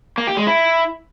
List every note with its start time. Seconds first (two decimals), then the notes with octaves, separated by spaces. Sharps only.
0.18 A#3
0.27 G4
0.37 G#3
0.47 E4